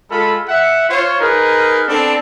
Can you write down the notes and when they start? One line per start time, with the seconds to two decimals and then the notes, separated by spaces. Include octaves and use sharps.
0.10 G#3 F4 A4 B5
0.49 E5 F#5
0.89 F4 C5 C#5
1.20 D#4 G#4 A#4 B4
1.88 B3 C4 D4 A4